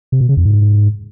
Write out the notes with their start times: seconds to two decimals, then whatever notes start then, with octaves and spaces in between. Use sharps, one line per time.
0.12 C3
0.21 B2
0.29 C#3
0.37 F2
0.45 G#2